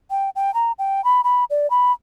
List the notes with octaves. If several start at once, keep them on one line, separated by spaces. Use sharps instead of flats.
G5
G5
A#5
G5
B5
B5
D5
B5